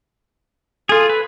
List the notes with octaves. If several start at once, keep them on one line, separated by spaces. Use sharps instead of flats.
F4 G#4 A4
B4